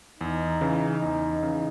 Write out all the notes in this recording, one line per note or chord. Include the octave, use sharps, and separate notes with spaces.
E2 D#4
C#3 E3
E2
C#3 E3